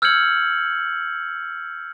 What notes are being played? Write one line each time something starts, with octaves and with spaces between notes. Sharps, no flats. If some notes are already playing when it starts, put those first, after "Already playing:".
E6 F6 G6 G#6 C#7 F#7